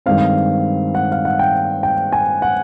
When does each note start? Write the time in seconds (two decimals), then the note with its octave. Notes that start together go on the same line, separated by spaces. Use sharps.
0.06 G2 D#3 G#3 C4 F5
0.95 F#5
1.12 F5
1.25 F#5
1.39 G5
1.83 G5
2.12 G#5
2.42 F#5